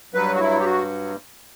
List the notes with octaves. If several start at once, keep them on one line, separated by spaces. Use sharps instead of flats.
G2 F#3 B4
F#4
E4
G4
F#4